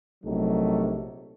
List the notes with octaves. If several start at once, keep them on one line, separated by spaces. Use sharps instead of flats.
A#1 C3 F#3 A3 D#4